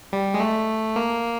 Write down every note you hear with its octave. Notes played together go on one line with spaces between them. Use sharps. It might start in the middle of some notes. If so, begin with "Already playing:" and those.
G3
G#3
A3
A#3